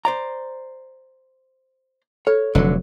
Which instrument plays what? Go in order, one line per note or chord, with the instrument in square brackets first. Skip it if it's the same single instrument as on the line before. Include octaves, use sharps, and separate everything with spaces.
[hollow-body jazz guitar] C5 D5 A#5
[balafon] A4 [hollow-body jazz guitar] C#5
[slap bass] F1 F#3 [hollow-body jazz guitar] D3